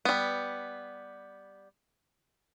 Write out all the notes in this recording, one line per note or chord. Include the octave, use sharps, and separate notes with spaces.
G3 B3